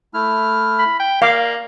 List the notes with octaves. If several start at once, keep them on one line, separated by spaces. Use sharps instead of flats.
A3 E4 F6
B5
G5
A#3 D5 F5 D6